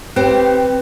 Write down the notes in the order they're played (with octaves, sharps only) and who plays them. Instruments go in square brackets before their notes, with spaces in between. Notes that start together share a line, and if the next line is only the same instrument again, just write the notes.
[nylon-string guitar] C4 [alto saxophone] G4 [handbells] B4